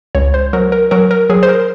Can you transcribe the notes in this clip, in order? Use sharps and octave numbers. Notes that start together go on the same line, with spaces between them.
C#2 C#5
C5
F#3 A#4
A#4
F#3 A#4
A#4
F#3 G#4
C5
A#4